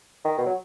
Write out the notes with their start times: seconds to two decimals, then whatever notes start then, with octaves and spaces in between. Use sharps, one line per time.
0.25 D#3
0.38 B2
0.46 F#3